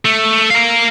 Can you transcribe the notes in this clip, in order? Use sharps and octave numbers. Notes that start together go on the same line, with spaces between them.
A3
A#4 F5